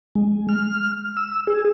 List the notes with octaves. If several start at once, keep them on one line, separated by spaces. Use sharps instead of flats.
G#3
F6
E6
G#4